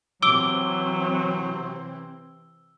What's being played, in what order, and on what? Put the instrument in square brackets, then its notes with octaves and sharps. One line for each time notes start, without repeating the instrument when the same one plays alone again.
[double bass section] C3 E3 C4 [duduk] F#3 [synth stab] D6 [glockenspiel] E6 G7